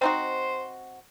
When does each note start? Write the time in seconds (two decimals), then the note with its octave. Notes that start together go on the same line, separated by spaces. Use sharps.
0.01 C4 D#4 F#4 C5